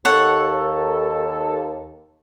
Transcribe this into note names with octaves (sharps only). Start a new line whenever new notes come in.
D#2 A4 C#5 F#5